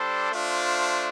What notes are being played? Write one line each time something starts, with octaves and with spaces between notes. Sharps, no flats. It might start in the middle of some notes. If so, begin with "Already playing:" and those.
Already playing: G3 D4 A4 C5
A3 D4 F4 C5